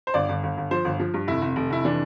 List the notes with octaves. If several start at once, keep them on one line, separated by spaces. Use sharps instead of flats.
C5
G1 D5
G1
G1
G1
F3 C5
G1
F3
G2
F1 E4
F1
F1
F1 E4
E3 D4